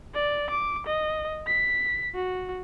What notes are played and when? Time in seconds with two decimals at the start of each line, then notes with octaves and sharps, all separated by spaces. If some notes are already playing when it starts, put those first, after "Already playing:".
0.14 D5
0.50 D6
0.87 D#5
1.47 B6
2.15 F#4